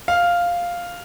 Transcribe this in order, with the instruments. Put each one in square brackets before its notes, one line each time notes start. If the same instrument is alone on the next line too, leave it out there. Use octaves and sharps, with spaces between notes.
[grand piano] F5